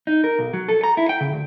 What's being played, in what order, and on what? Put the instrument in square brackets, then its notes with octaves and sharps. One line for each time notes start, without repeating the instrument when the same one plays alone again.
[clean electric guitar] D#4
A#4
B1
F#3
A4
A#5
E4
G5
C#3
D2